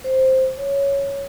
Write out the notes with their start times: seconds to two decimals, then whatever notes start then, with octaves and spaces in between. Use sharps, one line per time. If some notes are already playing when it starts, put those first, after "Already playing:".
0.04 C5
0.57 C#5